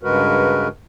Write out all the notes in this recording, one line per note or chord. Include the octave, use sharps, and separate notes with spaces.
G2 C#3 G#3 F#4 A#4 B4